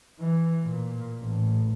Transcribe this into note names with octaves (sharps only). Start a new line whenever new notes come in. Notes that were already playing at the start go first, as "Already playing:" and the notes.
E3
A#2
A1